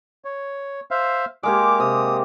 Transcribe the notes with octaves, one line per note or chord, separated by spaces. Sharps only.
C#5
C5 E5 F5
G#3 A#3 G4 D6
C3 D#6